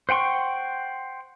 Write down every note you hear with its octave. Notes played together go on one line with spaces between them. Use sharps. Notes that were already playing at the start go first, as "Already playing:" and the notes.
C5 F#5 G5 C6 C#6